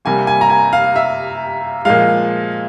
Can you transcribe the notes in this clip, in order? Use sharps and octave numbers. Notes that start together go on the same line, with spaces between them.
C3 G3 A#3 G#5
G#5
A#5
G#5
F5
E5
A#2 F3 G#3 F5